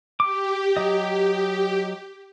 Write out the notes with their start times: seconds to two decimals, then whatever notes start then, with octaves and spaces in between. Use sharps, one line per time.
0.20 G4 D6
0.77 F#3 D#5